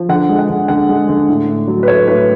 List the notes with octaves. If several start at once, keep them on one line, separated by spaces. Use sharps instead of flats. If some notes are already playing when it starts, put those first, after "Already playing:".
Already playing: F3
D3 F#5
G#3
F#5
D3
D3 F#5
G#3
D3
A2
A2
F#3
B4
A3 C#5
A2 B4